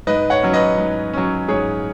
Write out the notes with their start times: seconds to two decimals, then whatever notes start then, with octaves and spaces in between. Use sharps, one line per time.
0.07 G#2 B4 D#5
0.30 C#5 F#5
0.43 F#3 C#4
0.54 B4 D#5
0.78 G#2
1.13 F#3 C#4
1.48 G#2 G#4 C#5